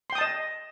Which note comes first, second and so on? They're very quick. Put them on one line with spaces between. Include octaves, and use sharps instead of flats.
C6 G5 D#6 A5 D#5